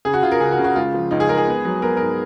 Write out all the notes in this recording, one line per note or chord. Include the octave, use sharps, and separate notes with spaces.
C#3 G#4
F#4
C#3 F4
A#4
C#2 G#4
F#4
C#3
F#4
G#3 F4
F3
C#2 D#4
G#4
G#3 A#4
G#4
B3
F#3
B3 A#4
G#2 A#4